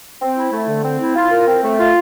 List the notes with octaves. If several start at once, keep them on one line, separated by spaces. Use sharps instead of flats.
C4
E4
A3
D3
C4
E4
F4
A#4
C4
A3
F4